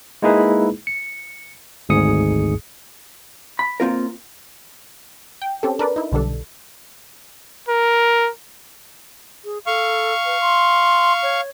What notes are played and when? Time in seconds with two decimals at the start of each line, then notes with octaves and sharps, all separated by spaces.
0.22 G#3 A#3 D#4 E4 G#4 B4
0.87 C#7
1.89 G#1 D2 G#2 G#4 D#6 C#7
3.59 B5
3.80 A#3 C4 F4 A#4
5.42 G5
5.63 C4 C#4 G4 A4
5.79 D4 A#4 B4 D5
5.96 D#4 E4
6.12 B1 D3 G3 D4 A4
7.68 A#4
9.45 G#4
9.67 A4 F5 C#6
10.26 B4
10.41 C6
11.23 C#5